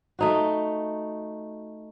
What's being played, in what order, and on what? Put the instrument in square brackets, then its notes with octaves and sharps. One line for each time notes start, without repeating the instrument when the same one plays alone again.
[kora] A3 D#4 F#4